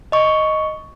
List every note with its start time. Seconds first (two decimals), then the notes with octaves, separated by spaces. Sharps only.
0.12 D#5 C#6